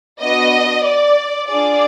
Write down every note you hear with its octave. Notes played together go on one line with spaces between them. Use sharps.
B3 D4 F#4 D#5
D5
D4 F4 G#4 D5